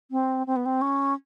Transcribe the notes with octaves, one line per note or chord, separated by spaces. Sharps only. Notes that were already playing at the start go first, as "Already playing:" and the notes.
C4
C4
B3
C4
C#4